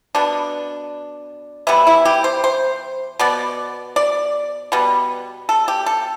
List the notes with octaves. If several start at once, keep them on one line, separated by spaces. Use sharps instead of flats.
B2 B3 D4
E3 G3 B3 E4
E4
G4
C5
C5
B2 B3 D5
D5
B2 G3 B3
A4
G4
A4